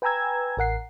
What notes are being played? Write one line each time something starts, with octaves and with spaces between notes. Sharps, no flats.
B4 G5 G#5 A#5 E6 G#6
A1 A#4 F#5 C7